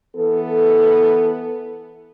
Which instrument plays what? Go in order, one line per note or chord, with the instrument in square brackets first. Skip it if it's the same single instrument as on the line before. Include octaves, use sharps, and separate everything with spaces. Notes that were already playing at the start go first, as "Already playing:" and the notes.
[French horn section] E3 B3 A4